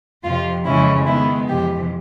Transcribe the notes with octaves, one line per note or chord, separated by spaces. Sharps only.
F2 C3 F3 F4
F2 C#3 E3 G#3 C#4 E4
D#3 G#3 B3 E4
F2 C3 E3 G4